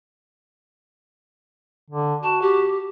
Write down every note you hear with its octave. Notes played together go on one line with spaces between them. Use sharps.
D3
F#4 A5
G4